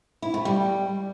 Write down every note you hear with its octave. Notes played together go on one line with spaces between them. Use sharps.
E4
A3
G3